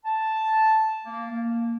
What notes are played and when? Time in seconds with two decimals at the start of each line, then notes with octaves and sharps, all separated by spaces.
0.05 A5
1.05 A#3
1.30 A#3